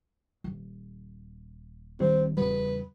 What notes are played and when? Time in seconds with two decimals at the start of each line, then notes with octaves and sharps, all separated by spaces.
0.44 D#1
2.00 D#3 G3 C4 D4
2.37 E2 C#3 G3 B4